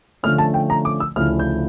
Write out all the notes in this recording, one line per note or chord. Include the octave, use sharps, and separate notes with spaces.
D3 F3 A3 C#4 F6
A5
G5
A#5
D6
E6
D2 C#3 F3 A3 E4 F6
G6